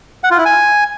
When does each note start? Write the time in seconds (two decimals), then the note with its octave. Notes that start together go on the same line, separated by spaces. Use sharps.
0.24 F#5
0.31 F4
0.38 E4
0.45 G#5